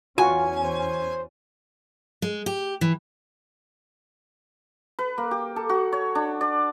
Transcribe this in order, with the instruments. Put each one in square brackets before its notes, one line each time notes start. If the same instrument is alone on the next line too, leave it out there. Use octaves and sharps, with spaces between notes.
[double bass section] E2 C#4 [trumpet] F4 [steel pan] F#4 [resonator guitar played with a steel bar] G#5
[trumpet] C5
[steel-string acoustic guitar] G#3
G4
E3
[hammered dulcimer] B4
A#3
G4
A4
F#4
C#5
D4
D5